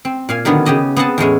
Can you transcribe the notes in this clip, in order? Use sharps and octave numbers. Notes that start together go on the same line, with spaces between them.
C4
A#2 F5 G#5
D3 D#3 F#3 B3 C#4 D4
C#3 B3 G4 D#5 A5
B3 C4 G#4 D#5 F#5 A5
E2 A2 G#3 C#4